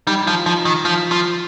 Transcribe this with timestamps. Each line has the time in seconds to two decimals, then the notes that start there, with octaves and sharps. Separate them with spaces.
0.07 G3 D#4
0.26 F3 F4
0.46 F3 D#4
0.65 D#3
0.85 F3 F4
1.11 F3